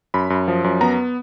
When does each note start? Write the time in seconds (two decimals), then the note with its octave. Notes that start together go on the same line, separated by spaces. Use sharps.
0.14 F#2 B5
0.30 F#2
0.48 F3
0.64 F#2
0.81 B3 A#5